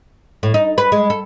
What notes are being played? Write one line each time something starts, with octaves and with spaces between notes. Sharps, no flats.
A2
D#4
B4
G#3
A4